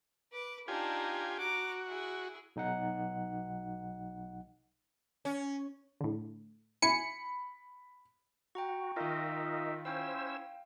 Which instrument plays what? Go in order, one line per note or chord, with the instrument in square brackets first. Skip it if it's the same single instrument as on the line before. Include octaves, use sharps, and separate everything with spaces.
[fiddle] B4 D6
[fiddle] D4 D#4 [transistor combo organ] F4 G4 G#5
[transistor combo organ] F#4 [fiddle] A#5 D6
[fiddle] E4 G#4
[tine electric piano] B1 D#4 F#5
[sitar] C#4
[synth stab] A2 D3
[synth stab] E4 G#5 C#7 [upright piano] B5
[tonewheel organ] F#4 [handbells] G5 A#5 C#6
[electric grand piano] D#3 F4 [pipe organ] D#4 E5 [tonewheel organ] A#4 D#5
[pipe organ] C#4 E4 [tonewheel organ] C5 E6 [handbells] F5 G5